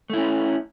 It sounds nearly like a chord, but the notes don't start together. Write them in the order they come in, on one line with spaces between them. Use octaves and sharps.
A3 E4 C#4